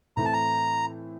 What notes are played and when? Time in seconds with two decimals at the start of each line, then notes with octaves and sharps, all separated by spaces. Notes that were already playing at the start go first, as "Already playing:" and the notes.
0.17 A2 E3 A3 C4 E4 A#5
0.25 A5
0.33 A#5